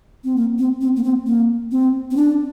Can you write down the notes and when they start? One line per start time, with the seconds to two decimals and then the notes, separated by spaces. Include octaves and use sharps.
0.24 C4
0.36 A#3
0.59 C4
0.81 C4
0.96 A#3
1.04 C4
1.26 A#3
1.71 C4
2.11 C4
2.17 D4